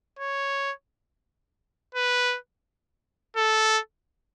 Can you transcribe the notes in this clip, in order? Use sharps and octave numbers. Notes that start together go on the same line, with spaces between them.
C#5
B4
A4